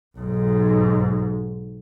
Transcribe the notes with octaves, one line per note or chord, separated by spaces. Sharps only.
B1 G#2